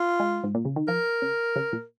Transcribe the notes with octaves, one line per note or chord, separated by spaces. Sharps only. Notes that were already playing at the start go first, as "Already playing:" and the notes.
Already playing: F4
G#3
G#2
A#2
C#3
D#3
F3 A#4
C#3
C#3
A#2